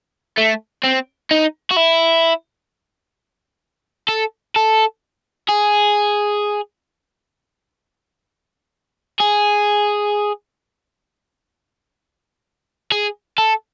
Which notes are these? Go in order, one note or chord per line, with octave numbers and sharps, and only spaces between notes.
A3
C4
D#4
F#4
E4
A4
A4
G#4
G#4
G#4
A4